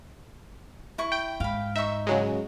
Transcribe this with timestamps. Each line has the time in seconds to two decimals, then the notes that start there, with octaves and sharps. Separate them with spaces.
0.98 E4 C#6
1.12 G5 D7
1.40 G#2 F5 B5
1.76 D#4 E5 C#6
2.07 C#3 F#3 G#3